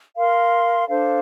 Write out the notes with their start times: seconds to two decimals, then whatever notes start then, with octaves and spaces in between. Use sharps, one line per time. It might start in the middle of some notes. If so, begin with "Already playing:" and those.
0.17 A#4 F5 C6
0.88 D4 A4 C5 F5